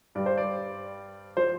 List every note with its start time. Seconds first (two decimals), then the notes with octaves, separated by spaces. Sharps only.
0.15 G2 G3 D5
0.26 C5
0.38 D5
1.37 F3 C5